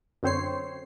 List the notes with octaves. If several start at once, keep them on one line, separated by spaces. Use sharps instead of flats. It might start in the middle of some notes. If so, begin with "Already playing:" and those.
F#2 D3 C4 C5 C#5 C7